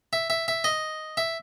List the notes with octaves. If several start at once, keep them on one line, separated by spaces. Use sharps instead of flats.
E5
E5
E5
D#5
E5